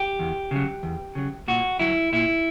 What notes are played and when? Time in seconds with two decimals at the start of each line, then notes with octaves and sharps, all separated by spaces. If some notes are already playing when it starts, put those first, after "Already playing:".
Already playing: G4
0.19 E2
0.51 C#3 F#3
0.83 E2
1.15 C#3 F#3
1.48 A#2 F#4
1.79 F#3 E4
2.13 A#2 E4